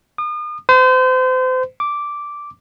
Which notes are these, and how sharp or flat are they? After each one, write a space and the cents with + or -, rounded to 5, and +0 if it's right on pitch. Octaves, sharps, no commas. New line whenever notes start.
D#6 -40
C5 -35
D6 -5